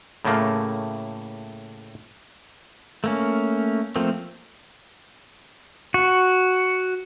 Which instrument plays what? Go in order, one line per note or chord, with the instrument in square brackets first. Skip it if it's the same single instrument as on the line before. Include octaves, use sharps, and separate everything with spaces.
[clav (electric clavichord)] A2 C#3 A3 A#3
[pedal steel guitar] A3 A#3 C#4
F3 A3 A#3 C4
F#4